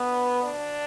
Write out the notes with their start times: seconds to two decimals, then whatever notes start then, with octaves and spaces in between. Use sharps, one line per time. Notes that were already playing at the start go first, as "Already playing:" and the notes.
Already playing: D2 D3 B3
0.44 D4